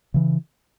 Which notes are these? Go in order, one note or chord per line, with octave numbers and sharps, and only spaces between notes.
C#3 E3